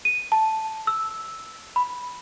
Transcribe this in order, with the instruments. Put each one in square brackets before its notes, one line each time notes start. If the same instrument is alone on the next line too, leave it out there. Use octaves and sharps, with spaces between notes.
[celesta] D#7
A5
E6
B5